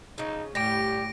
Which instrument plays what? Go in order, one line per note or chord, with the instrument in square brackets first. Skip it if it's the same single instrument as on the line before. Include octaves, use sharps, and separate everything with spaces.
[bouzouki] C#3 F3 [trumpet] D#4
[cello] A2 [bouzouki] G3 [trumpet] G4 [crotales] A#6 D7